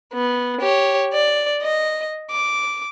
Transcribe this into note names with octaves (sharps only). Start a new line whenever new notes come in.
B3
G4 C#5
D5
D#5
D6